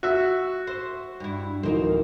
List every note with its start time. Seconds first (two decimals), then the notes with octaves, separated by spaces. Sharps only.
0.03 F#4 E5
0.67 C5
1.20 G2 E4
1.63 D1 E3 A#3 D#4 A#4 C5